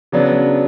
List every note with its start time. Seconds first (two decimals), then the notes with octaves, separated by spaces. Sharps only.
0.12 C#3 F#3 B3 D4